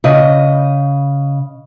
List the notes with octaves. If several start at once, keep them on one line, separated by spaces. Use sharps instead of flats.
C#3 D#5